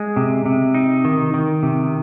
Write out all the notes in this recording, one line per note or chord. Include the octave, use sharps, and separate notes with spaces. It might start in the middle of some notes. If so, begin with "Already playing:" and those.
Already playing: G#3
C3
C3
D#4
D#3
D#3
C3